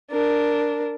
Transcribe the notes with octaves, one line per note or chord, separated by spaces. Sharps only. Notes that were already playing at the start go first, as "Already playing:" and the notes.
D4 A#4